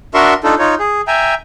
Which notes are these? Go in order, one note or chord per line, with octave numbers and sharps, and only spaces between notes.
D4 F#4 A#4 E5 C6 C#6
D4 D#4 F4 A4
D#4 F4 C#5
G#4
E5 G5 G#5 A#5